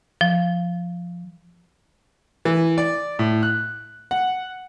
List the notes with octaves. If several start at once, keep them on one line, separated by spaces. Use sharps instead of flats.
F3
E3
D5
A2
F#6
F#5